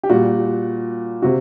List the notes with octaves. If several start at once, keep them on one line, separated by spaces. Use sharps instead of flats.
G4
A#2 G3 F#4
C3 F#4